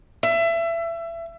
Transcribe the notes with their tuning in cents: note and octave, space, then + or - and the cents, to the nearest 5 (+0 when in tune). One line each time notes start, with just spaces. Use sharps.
E5 +25